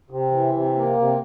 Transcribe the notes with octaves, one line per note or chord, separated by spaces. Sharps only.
C3
E3
C3
A#3
C3